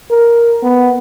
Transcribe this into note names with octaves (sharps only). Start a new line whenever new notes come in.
A#4
B3